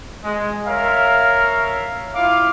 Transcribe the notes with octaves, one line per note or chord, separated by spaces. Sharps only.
G#3
A#4 C#5 E5 F5
E4 F4 F5 D6